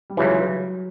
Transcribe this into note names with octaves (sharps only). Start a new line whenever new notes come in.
G3
C#2 C#3 E3 F#3